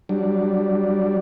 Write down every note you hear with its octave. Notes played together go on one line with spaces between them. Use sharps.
F#3 G3 D4